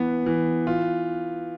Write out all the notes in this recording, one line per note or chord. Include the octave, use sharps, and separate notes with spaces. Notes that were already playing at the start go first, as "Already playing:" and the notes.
Already playing: E3 B3
E3
F4